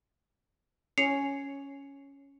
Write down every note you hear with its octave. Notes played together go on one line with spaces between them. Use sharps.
C#4 C7 C#7 F7